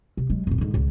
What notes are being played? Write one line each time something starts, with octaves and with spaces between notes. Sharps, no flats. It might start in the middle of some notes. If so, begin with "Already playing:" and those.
C3
F#3 G#3
F2 A2
G#2 D3
C#2